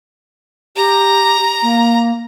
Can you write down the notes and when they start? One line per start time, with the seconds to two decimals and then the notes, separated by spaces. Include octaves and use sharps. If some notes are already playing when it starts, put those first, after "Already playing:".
0.76 G4 A#5
1.63 A#3